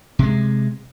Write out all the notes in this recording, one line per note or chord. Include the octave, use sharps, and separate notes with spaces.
C3 G#3